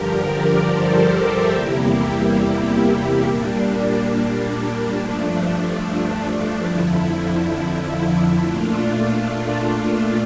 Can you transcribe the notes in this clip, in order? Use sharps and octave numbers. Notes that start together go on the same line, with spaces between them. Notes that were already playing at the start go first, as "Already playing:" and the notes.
Already playing: G2 D3 F3 G4 A#4
A#4 D5
A4 C5
A#4 D5
C5 E5
E2 C3 G3 A#3 E4 G4
A#2 G3 A#3 D4
G2 F3 A3
F2 D3 F3 E4
A#2 A3 D4 F4